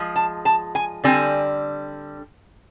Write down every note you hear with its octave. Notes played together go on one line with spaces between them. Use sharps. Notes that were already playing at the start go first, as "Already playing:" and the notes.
Already playing: F3 G#3
A5
A5
G#5
D3 G3 C4 G#5